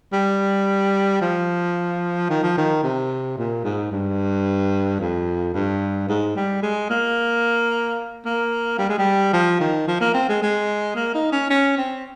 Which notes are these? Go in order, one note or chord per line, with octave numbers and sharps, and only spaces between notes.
G3
F3
D#3
F3
D#3
C3
A#2
G#2
G2
F2
G2
G#2
G3
G#3
A#3
A#3
G3
G#3
G3
F3
D#3
F3
A#3
C4
G#3
G#3
A#3
D#4
C#4
C#4
C4